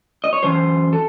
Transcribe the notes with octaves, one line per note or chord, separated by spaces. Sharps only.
D#5
C#5
F#2 E3 C5
A4